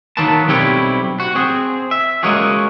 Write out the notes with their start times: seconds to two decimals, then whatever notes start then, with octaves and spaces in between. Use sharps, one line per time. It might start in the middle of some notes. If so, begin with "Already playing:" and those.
0.17 D#3 F#3 A#3 B3 A5
0.48 B1 G3 C4 E4 G4 C#5
1.20 F#4
1.35 C4 G#4
1.91 E5
2.23 G#3 A#3 C#4 F#4 G#4